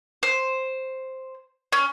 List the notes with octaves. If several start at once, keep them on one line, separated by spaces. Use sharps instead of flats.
C5
C#4